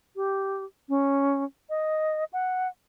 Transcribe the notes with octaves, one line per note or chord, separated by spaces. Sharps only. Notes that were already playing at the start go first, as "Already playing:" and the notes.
G4
C#4
D#5
F#5